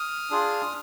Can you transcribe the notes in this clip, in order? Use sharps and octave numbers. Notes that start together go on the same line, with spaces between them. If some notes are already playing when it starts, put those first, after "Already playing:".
Already playing: D#6 F6
D4 F4 G#4